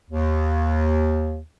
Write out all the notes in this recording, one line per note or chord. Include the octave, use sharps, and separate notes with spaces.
D#2